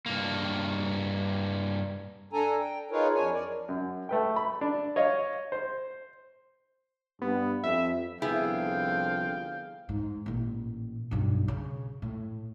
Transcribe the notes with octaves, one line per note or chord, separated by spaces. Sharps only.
G2 A#3
D4 A4 G#5 A#5
G5
D#4 F4 G#4 A#4 B4 C#5
F2 D4 C#5 G#5
A#4 D5
F#2
A3 B4 G5
B5
D4
C#5 D#5 F5
C5
G2 B3
F2 E5
C2 D3 F3 B3 E4 G#4 F5 G5
G#2
A1 A#2
B1 G2
C#3
A2